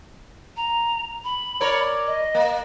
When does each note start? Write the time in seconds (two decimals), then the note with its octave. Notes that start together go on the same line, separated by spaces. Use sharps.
0.57 A#5
1.24 B5
1.61 A#4 C#5 D5
2.07 D#5
2.35 A#3